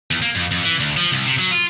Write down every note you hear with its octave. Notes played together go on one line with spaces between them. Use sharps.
E2
A#3
F2
F2
E3
D2
F3
C2
C3
F#3
F4